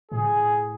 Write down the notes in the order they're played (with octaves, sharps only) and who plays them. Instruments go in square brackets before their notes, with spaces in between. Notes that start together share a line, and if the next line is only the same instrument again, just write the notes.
[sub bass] A2 [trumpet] G#4